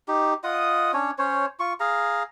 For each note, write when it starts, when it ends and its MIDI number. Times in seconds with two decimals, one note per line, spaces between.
0.08 0.34 63
0.08 0.34 67
0.44 0.92 65
0.44 0.92 75
0.44 0.92 78
0.44 0.92 87
0.94 1.11 61
0.94 1.11 62
0.94 1.11 73
1.19 1.46 61
1.19 1.46 72
1.19 1.46 73
1.60 1.73 65
1.60 1.73 85
1.80 2.23 68
1.80 2.23 77
1.80 2.23 82